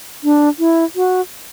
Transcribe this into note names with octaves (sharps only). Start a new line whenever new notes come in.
D4
E4
F#4